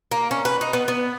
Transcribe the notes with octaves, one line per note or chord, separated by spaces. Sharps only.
A#3
C#4
B4
D#4
B3
B3